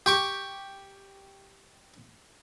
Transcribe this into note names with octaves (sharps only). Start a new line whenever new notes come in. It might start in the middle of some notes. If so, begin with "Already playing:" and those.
G4 C#6 D6